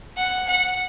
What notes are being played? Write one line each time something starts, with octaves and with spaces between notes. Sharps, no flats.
F#5
F#5